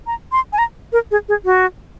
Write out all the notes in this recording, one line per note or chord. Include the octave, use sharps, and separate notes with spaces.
A#5
C6
G#5
A#5
A#4
G#4
G#4
F#4